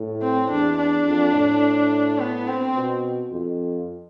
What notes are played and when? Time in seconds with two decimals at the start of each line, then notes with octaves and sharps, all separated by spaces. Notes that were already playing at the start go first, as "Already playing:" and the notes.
Already playing: A2
0.22 C4
0.50 E2 D4
0.78 D4
1.06 F2
1.34 A2
2.19 B3
2.47 C4
2.75 B2
3.32 F2